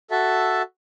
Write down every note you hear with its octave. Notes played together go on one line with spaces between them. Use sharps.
F#4 A4 E5 A5